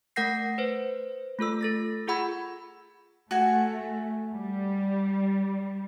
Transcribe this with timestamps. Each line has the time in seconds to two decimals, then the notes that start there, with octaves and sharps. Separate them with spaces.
0.16 A3 A#4 F#5 G6 A#6 C7
0.58 B4 C5
1.39 A3 F4 A4 E6
1.61 A4 A6 A#6
2.07 F4 G#4 F#5 B5 E6 G#6
3.31 A3 F#4 G#5
4.34 G3